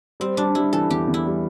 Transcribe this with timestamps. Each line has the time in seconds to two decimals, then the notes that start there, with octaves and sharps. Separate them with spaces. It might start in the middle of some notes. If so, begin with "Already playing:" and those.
0.20 G3 C4
0.37 G3 D4
0.55 G3 E4
0.73 E3 A4
0.90 E2 G4
1.08 E2
1.14 E4
1.25 G3